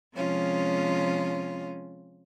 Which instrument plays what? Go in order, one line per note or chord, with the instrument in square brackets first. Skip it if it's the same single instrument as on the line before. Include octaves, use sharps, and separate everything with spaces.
[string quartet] C3 F3 G#3 C#4 F4